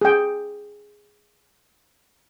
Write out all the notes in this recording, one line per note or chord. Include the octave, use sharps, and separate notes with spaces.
G#4 G5